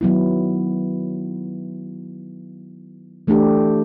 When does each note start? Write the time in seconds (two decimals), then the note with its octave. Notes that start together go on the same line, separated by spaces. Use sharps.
0.01 D#3 F#3 B3 E4
3.27 E3 A3 D4 G4